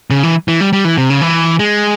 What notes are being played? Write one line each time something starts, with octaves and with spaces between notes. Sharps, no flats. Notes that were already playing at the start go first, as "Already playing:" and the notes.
C#3
E3
E3
G3
G3
E3
C3
C#3
E3
G#3